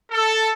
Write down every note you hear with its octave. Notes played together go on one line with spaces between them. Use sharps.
A4